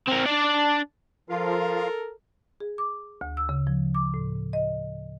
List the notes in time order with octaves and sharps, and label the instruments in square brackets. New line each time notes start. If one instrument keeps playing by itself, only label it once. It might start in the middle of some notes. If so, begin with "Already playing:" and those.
[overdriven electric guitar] C4 A#4
D4 D5
[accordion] F3 F4 F5 [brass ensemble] A4 A#4
[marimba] G#4
D6
D2
E6
C#3
F3
D6
A2
D#5